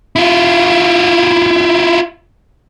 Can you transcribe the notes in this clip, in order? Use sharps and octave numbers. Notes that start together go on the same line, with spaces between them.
E4 F4